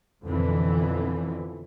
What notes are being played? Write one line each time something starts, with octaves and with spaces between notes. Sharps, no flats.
F2 B2 D3 E3